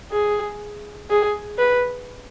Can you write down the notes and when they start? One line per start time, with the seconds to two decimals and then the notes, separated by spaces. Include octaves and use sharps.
0.12 G#4
1.10 G#4
1.59 B4